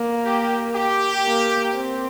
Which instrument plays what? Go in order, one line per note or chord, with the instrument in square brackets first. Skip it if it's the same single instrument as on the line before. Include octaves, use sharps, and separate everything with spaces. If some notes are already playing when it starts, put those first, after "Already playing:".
Already playing: [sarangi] A#3
[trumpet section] G4
G4
[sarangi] A#3
C4